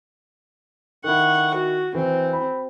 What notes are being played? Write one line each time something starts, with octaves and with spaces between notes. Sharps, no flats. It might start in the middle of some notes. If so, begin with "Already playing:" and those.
D#3 E4 F#5 C#6
F#4
E3 C4
B5